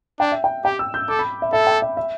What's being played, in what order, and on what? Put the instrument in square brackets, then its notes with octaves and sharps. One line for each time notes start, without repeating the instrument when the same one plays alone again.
[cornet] D4 [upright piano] G5
[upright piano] E5
G5
[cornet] G4 [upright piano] G5
[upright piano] E6
G6
[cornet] A4 [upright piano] D6
[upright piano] B5
E5
[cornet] A4 [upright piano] E5
[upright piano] G5
E5
E5